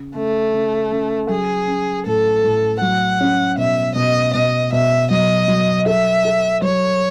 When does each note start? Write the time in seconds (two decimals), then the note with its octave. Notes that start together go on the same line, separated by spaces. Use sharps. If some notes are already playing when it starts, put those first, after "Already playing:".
Already playing: C#3
0.15 C#3 A3
0.53 C#3
0.92 C#3
1.29 F#3 G#4
1.68 C#4
2.06 A2 A4
2.44 A2
2.81 F#3 F#5
3.20 C#4
3.57 B2 E5
3.96 B2 D#5
4.34 B2 D#5
4.72 B2 E5
5.10 F#3 D#5
5.48 F#3
5.86 A4 E5
6.25 A4
6.62 F#3 C#5